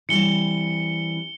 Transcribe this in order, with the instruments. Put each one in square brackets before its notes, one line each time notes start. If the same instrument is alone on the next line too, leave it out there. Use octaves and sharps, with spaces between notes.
[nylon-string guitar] E3 G3 C4 [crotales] C#7 G7